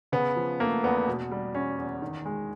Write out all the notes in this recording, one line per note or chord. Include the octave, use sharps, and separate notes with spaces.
C#3 B3
F3
A3 A#3
E2 B3
B2
G3
E2 C#4
E2
D#3
G#3